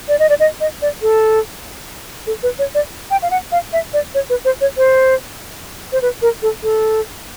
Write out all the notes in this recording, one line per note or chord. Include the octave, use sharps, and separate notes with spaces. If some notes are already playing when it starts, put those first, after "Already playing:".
D5
D#5
D5
D#5
D#5
D5
A4
A4
B4
C#5
D5
G5
F5
F#5
F5
E5
D5
C#5
B4
C5
C#5
C5
C5
B4
A#4
A4
A4